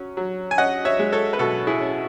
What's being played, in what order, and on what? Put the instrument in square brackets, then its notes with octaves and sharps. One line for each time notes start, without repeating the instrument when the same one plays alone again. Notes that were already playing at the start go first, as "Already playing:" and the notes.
Already playing: [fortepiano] F#3 C#4
F#3
G#5
C#4 D#5 F#5
C#5 E5
G#3
A4 C#5
B4
B2 F#4 A4
E4 G#4
C#4